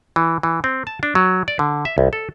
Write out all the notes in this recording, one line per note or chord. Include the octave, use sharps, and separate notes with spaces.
E3
E3
C4
A5
D4
F#3
D5
D3
E5
C2
A4